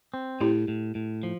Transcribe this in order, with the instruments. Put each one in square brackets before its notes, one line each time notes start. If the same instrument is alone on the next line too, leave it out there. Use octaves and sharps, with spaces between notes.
[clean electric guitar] C4
[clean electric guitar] A2 [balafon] E4 G4
[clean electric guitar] A2
A2
F3